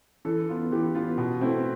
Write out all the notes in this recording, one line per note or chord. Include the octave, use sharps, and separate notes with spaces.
E3 A4
B3 F4
E3 G4
B3 F4
B2
A3 C4 E4